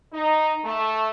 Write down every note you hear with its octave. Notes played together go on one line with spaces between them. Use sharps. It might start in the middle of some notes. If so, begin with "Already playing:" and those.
D#4
A3